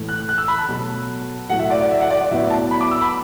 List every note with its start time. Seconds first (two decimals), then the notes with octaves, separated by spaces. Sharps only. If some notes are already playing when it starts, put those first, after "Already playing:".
Already playing: A2 E3 A3
0.09 F#6
0.29 F#6
0.38 E6
0.48 B5
0.58 A5
0.68 B2 F#3 A3
1.50 A2 F#3 A3 F#5
1.59 E5
1.70 D5
1.81 D5
1.91 E5
2.01 F#5
2.11 D5
2.21 D5
2.31 A2 F#3 B3 E5
2.50 A5
2.71 B5
2.81 D6
2.91 E6
3.02 B5